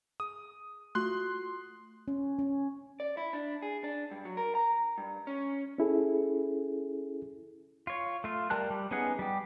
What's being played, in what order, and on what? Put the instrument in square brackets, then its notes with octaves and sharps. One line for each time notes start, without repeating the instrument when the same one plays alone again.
[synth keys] G#4 [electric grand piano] D#6
[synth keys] A3 F4 F#4 [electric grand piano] C6 F#6
[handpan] C#4
C#4
[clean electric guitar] D5
E4
D4
G#4
D4
G2
F#3
A#4
A#5
G2
C#4
[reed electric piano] C#4 E4 G#4 A4
[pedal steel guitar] F4 C#5
A3 F4
G3 A#4 A5 F#6
G3
B3 C#4 D#4 G#4 F#5
G3 G4